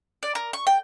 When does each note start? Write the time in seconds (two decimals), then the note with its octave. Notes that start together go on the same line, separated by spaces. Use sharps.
0.23 D5
0.35 A#4
0.53 C#6
0.67 G5